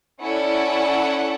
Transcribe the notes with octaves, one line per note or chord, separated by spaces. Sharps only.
C#4 E4 A4 D5 F#5